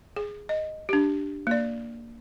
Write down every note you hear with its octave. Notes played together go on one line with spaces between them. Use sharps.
G#4
D#5
D4 G4
A#3 D5